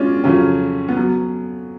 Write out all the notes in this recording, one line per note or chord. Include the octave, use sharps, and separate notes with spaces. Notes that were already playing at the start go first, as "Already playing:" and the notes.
Already playing: B2 G#3 C#4 D4 F4
F2 C#3 F#3 C#4
B3
F#3